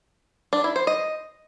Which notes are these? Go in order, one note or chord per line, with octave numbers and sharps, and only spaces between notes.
D4
E4
C5
D#5